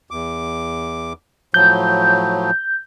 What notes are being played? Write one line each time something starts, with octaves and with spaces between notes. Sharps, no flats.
E2 D6
A2 F3 F#3 G6